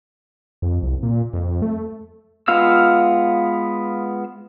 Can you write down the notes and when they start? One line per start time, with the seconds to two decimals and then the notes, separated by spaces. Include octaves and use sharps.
0.62 F2
0.83 C2
1.03 A#2
1.33 F2
1.62 A3
2.48 G#3 B3 F4 F5 E6